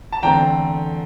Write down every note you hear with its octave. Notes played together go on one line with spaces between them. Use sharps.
A5
E2 D3 A3 C4 G5 A#5